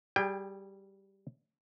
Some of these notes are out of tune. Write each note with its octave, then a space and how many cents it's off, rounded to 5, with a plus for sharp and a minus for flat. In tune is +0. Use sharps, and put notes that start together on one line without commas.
G3 -10 G#4 -25 G5 +15